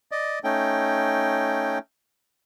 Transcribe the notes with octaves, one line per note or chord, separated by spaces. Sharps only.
D5 D#5
A3 C#4 D#4 G5